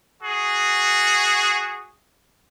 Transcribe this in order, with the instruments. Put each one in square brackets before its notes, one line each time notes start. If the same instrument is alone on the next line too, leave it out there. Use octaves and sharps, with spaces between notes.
[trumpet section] F#4 G#4